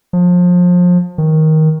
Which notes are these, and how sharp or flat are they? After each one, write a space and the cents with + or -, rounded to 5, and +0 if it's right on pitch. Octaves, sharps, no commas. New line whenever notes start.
F3 +30
D#3 +15